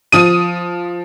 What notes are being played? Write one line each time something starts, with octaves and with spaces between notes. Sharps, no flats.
F3 D#6 D#7